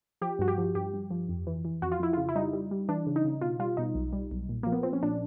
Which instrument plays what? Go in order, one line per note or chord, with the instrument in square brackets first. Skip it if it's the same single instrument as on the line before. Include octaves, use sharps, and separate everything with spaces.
[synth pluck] F3 G4
G2 F#4
G4
F3
G2 G4
G2
F3
F2
E3
E3
F2 F#4
F4
F2 E4
C#3 F4
E4
G3 D#4
G3
G3
E3 D4
C#3
D#4
C#3
B2 F4
G3 F4
B2 D#4
B1
G3
B1
A#2
F3 A#3
B3
F3 C4
C#4
A#2 D4